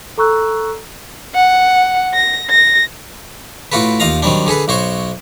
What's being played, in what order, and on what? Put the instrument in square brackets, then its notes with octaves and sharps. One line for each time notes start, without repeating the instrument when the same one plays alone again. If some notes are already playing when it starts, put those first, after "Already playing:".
[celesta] A4 A#5 C#6 E6 F#6
[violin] F#5
A#6
A#6
[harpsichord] A2 F4 F#4 A4 B4
D#2 F4 D#5 F5 A#5
D#3 F#3 G3 C4 D4
D3 G#4 A4 B4
B1 F#4 C5 C#5